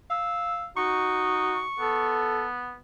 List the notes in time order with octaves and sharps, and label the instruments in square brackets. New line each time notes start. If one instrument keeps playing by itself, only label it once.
[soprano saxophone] F5 [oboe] E6
[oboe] D#4 [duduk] F#4 [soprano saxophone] C#6
[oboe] B3 [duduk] A4